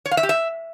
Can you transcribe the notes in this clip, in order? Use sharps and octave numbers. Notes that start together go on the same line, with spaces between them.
C#5
F5
E5
G4
E5